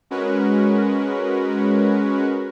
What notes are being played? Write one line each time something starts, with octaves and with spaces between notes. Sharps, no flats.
G#3 C#4 F#4 A#4 B4